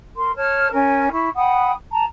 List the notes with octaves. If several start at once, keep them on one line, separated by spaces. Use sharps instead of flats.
A#4 C6
C#5 A5 F6
C#4 A#4 G#5
E4 C#6
F#5 G5 B5 D#6
A5 A#5